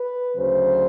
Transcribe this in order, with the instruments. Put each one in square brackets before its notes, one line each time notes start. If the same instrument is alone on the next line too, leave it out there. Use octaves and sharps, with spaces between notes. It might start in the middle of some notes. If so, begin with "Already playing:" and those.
Already playing: [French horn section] B4
D2 C#3 F#3 C5